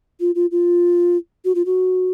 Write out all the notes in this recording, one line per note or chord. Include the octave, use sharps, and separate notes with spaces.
F4
F4
F4
F#4
F4
F#4